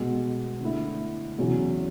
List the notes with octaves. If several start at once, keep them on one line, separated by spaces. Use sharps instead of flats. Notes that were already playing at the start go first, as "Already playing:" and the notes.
Already playing: B2 G#3 B3
D3 A3 E4
E2 C#3 F#3 C#4 E4